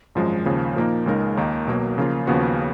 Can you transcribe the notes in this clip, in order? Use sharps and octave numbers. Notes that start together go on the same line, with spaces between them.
G#1 F#2 F3 G#3
D#2 C#3 F3
A#2 F3 A#3 D#4 A#4
C#2 C#3 G#3 D#4 A#4
D#2 D#3 A#3 D#4
B1 B2 F#3 A#3
C#3 F3 A#3 F4
D#2 C#3 F3 B3 F#4